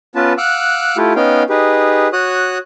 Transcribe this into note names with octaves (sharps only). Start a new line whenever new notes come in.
B3 C#4 F4 B4 A5
F5 F#5 D6 E6 F#6
A3 E4 F4 G4
B3 C#4 D#4 F5 G5
D#4 G4 G#4 B4
F#4 C#5 D#6 F#6